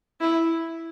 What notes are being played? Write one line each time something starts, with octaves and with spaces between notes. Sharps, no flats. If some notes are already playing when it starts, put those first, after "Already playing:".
E4